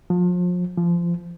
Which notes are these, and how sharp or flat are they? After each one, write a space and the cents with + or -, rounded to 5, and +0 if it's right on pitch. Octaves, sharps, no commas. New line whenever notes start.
F3 +35
F3 -20